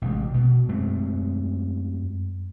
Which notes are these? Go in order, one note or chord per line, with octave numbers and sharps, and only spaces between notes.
A1 C3 G#3
B2
F#2 G#3 A3 C4